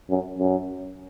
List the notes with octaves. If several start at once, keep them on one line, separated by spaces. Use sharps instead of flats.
F#2
F#2